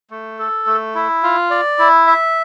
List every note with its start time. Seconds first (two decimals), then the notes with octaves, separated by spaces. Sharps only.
0.11 A3
0.39 A4
0.66 A3
0.95 E4
1.23 F4
1.50 D5
1.79 E4
2.07 E5